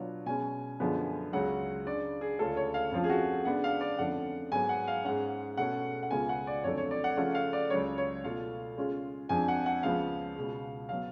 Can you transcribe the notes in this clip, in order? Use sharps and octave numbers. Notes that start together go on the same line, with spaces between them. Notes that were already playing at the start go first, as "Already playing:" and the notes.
Already playing: B2 F#3 B3 D4 F4
B2 G#3 C#4 G#5
F#2 D3 F3 G#3 B3
C#2 C#3 F#3 F#5
C#3 G#3 D4 D5
G#4
D2 C#3 G#3 C#4 F4 A4
C#5
F5
F2 F3 A3 C#4 F4
G#4
F#4
C#3 G#3 B3 D4 F#5
F5
D5
F2 D3 F3 A3 C#4 F#5
G#2 F#3 B3 G#5
F#5
F5
G#2 G#3 C#4 F#5
B2 A3 C#4 F#5
F#5
C#2 C#3 G#3 B3 F4 G#5
F#5
D5
F2 D3 F#3 A3 C#5
C#5
D5
F#5
C#3 F3 A3 C#4 F4 F#5
F5
D5
C#2 C#3 F#3 C#5
C#5
B2 A3 F4 F5
C#3 G#3 C#4 F4
F2 F3 G#3 D4 G#5
F#5
F#5
C#2 C#3 F3 B3 F5
C#2 B2 G#3
F#3 B3 F5